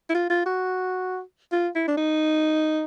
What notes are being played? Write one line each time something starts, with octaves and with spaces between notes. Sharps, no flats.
E4
F4
F4
F#4
F4
E4
D4
D#4